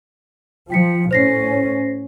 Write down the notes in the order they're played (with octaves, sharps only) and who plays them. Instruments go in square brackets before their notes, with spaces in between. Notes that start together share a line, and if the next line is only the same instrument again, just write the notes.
[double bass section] F3 [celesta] G5 B6 C#7
[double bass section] A2 C#4 [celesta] C5 A#6 C7